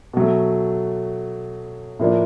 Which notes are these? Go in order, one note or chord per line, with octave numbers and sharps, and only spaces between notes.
B2 F#3 A3
A2 F3 A#3 D4